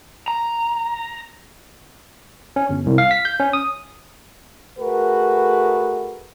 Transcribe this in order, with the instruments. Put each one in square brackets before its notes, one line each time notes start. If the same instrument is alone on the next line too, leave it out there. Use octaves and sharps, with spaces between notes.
[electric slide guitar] A#5
[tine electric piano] C#4
G1
C2
F5
B6
G6
C#4
D#6
[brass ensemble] A3 F#4 G#4 A#4 B4